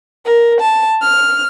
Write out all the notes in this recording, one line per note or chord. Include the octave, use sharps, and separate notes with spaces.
A#4
A5
F6